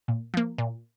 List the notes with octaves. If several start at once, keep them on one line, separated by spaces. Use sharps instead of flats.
A#2
F3 A#3
A#2